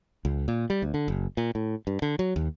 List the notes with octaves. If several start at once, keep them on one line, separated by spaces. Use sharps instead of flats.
C#2
A#2
G3
D2
D3
F#1
A#2
A2
G2
D3
F#3
D#2